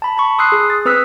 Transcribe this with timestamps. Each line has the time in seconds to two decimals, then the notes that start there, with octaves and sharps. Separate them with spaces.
0.02 A5 B5
0.17 A5 B5 C#6
0.38 C6 D#6 E6 F#6 C7
0.52 G#4
0.70 A6
0.85 C4 B4 D#6 E6 F#6 B6